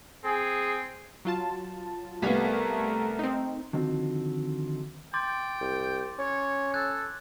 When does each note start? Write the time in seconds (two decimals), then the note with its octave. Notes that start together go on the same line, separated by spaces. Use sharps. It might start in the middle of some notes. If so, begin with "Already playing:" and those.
0.24 C4 G#4
1.25 F#3 F4 A5
2.22 C2 A3 B3 A#4 F5 G#6 B6
3.19 C4 D#4
3.73 D3 D#3 F3 C4 F#4
5.14 G5 C6 D6 A6
5.61 C2
6.18 C#4 C#5
6.74 A4 F#6 G#6